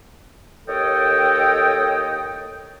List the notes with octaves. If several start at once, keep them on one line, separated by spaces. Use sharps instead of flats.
D#2 A4 C#5 D#5 G5